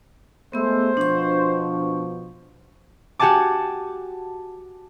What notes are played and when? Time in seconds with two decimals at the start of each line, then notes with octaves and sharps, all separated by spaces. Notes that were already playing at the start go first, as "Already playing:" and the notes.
0.53 G#3 A3 B3 C5 E6
0.97 B2 F3 D4 C#6
3.19 F#4 G4 F#5 G#5 A5 D6